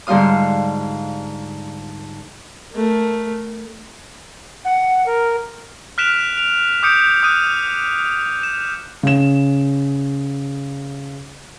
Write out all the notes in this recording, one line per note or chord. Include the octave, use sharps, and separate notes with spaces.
G#2 D3 G3 F4 F5 D#6
A3 A#4
F#5
A#4
F6 F#6 B6 D7 E7 F7
D7 F7
D6 D#6 G6 C#7 D7
D6 D#6 F#6 D#7
E7
C#3 E7